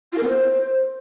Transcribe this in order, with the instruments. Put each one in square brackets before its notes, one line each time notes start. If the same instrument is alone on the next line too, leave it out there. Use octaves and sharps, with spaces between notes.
[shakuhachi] F4
A#4
B3
C5